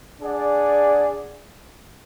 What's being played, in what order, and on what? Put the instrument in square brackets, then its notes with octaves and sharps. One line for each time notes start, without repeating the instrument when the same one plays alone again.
[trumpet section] D4 G#4 D5 F#5